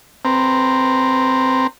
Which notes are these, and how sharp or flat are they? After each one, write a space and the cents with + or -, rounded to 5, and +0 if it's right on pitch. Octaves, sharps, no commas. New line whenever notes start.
C4 +0 B4 +10 A#5 -10